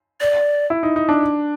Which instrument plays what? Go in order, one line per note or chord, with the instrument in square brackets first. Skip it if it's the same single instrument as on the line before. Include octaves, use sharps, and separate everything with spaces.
[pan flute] D5
[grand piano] E4
D#4
D#4
D4